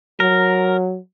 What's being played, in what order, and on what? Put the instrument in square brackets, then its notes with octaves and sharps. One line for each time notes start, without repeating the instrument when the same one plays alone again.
[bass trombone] F#3 [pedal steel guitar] A#4